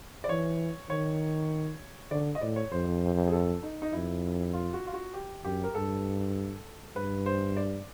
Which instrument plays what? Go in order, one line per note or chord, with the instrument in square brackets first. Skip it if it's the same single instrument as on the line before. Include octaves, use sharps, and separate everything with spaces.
[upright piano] D5
[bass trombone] E3 [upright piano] C#5
[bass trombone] D#3 [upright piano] C#5
[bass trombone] D3 [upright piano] D5
[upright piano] D#5
[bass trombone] A2 [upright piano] D5
[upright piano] C#5
[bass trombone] F2 [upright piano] C5
[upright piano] G#4
A4
D#4
D#4
[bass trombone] F2 [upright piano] E4
[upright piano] F4
F#4
F4
F#4
G4
[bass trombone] F#2 [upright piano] G4
[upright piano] A#4
[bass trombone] G2 [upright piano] A4
[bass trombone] G2 [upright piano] B4
[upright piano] C5
D5